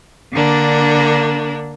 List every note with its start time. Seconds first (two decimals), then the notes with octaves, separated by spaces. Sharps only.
0.33 D3 A#3 D4